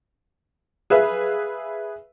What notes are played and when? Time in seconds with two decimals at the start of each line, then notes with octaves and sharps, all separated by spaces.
0.90 G#4 B4 E5 F5